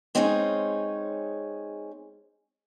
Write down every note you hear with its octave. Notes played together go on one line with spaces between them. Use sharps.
G#3 C4 C#4 D#4 G#4 C#5